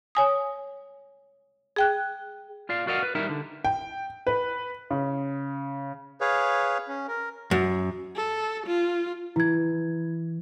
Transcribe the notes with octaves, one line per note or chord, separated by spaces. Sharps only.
C#5 G#5 D#6
G#4 G5 F#6
F4 D5 F5
F#4 A#4 D5 D#5 F5 F#5
B4
G3 D#4 E4 A#4 E5
D3
G5
B4
C#3
G#4 B4 C#5 F5
C#4
A#4
F#2
A4
F4
E3 E4 G#6